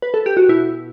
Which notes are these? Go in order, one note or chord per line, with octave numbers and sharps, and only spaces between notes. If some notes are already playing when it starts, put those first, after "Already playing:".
B4
A4
G4
F#4
B2 E4